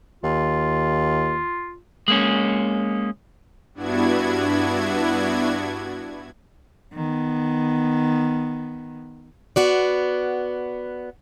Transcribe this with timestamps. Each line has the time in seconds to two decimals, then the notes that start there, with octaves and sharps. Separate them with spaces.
0.24 D#2 F4
2.08 G#3 A#3 C#4
3.74 G2 B3 D4 E4 F#4 G#6
6.93 D#3 B3
9.56 B3 F#4 D5